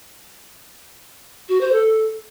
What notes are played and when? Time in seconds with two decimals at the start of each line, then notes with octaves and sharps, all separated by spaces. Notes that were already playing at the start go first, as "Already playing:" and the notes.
1.49 F#4
1.61 C5
1.73 A4